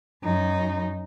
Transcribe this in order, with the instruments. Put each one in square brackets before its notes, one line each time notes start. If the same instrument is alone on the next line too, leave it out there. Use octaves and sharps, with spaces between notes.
[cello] F#2 D#4